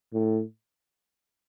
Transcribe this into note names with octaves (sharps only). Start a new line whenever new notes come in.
A2